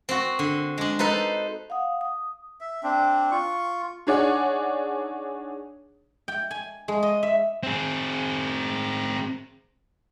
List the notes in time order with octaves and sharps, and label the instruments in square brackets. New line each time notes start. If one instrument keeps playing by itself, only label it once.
[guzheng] C4 F#4
D3
G#3 D4
D#4 A4 B4 C5
[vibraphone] F5 F#5 D#6
D#6
[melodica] E5
C4 D4
F4 C#6
[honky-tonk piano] D4 D#4 G#4 C#5 D5 F#5
[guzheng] G5
G#5
G#3
D#5
E5
[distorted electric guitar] C4 G#4